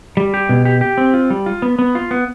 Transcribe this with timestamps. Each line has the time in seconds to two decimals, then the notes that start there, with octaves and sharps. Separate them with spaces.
0.17 G3
0.34 G4
0.49 B2
0.65 G4
0.81 G4
0.98 C4
1.14 F4
1.30 G3
1.46 F4
1.62 B3
1.79 B3
1.95 F4
2.11 B3